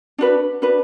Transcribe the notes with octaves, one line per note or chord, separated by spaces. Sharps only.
D4 F#4 B4
D4 F#4 B4